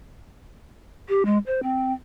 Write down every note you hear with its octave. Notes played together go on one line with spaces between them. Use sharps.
G4
G#3
C5
C4